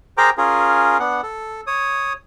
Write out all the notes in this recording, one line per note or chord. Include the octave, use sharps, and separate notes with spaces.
G#4 A#4 C5 G5 A#5 D6
C#4 F4 G#4 A#4
B3 D4 F#5
A4
C#5 D#6